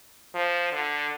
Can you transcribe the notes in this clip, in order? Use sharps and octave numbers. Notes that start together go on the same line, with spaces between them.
F3
D3